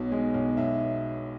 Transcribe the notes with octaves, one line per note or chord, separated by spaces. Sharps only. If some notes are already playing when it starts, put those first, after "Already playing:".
Already playing: B1 B2 C#5
G#3
B1
B1 E5